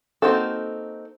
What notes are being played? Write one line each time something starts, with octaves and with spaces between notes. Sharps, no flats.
A#3 C4 D#4 F#4 A4